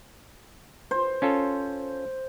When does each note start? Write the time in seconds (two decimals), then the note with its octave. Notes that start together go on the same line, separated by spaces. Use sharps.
0.91 C5
1.22 C#4 F4 A4